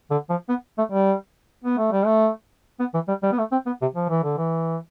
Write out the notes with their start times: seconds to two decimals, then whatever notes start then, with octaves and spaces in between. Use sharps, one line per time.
0.11 D3
0.30 F3
0.49 B3
0.78 A3
0.92 G3
1.64 B3
1.78 A3
1.92 G3
2.06 A3
2.80 B3
2.94 E3
3.08 G3
3.23 G3
3.32 B3
3.38 A3
3.52 C4
3.66 B3
3.82 C3
3.95 F3
4.09 E3
4.23 D3
4.37 E3